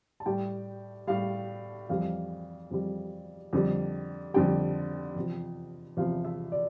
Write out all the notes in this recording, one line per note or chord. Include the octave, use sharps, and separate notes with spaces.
A5
A2 G3 G5
A2 G3 F5
F2 E3 G3 F5
F2 E3 G3
F2 D3 G3
F2 D3 G3 G5
E2 C3 F3
E2 C3 F3 F5
E5
D5